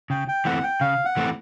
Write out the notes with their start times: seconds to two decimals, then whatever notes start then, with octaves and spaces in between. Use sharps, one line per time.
0.10 C#3 G5
0.28 G5
0.45 E3 A3 C4 F#5
0.63 G5
0.81 C#3 F5
1.05 F#5
1.17 E3 A3 C4